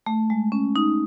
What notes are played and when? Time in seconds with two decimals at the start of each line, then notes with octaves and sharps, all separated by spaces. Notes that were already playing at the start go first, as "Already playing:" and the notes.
0.06 A3
0.30 G#3
0.52 C#4
0.76 D#4